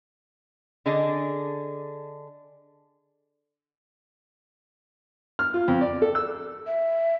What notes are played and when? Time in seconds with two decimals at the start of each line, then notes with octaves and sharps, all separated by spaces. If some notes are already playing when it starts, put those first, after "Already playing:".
0.86 D3 D4 G#4 A4 D#5
5.39 F6
5.54 F4
5.68 F2
5.81 D5
6.02 A4
6.15 E6
6.67 E5